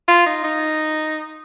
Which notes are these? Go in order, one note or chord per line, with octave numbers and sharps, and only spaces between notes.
F4
D#4
D#4